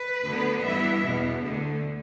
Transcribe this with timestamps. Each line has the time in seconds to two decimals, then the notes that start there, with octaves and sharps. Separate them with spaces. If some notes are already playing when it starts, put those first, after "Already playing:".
Already playing: B4
0.24 D2 D3 B3
0.63 G2 E3 B3 E4 E5
1.02 E2 B2 B3
1.42 D2 D3 A3